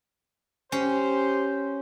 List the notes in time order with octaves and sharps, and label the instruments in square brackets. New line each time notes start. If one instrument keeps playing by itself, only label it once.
[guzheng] C#4 [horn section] G4 C5